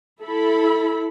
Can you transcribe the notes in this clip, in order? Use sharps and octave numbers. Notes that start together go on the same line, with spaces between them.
E4 A4 B5